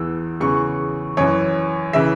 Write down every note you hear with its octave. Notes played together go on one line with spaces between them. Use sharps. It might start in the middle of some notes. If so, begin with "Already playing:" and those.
Already playing: E2 E3 E6
E2 C#3 E3 C#6
F#2 E3 C#5
C#3 E3 E5